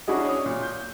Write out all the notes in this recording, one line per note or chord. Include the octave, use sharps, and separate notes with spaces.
C#4 D4 E4 F#4 G#4 D#5
C#5 D#6
A#2
G6